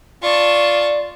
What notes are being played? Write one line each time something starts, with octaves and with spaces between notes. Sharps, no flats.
F4 D5 A5 C#6